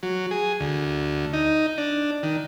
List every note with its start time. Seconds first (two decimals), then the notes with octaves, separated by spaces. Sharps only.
0.03 F#3
0.31 G#4
0.60 D2
1.33 D#4
1.78 D4
2.23 D#3